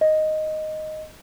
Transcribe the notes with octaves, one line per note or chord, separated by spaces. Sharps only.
D#5